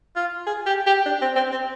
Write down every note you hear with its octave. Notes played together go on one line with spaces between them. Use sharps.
F4
G#4
G4
G4
D4
C4
C4
C4